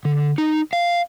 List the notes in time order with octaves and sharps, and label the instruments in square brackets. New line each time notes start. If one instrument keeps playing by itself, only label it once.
[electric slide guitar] D3
D#4
F5